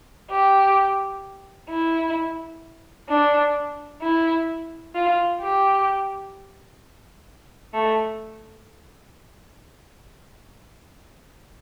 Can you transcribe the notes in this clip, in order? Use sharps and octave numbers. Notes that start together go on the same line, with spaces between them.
G4
E4
D4
E4
F4
G4
A3